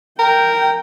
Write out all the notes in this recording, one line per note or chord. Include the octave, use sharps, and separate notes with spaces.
A#4 G5